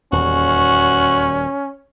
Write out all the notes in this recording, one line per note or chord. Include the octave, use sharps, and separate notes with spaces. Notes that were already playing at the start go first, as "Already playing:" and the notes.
D#1 E2 C#4 F#4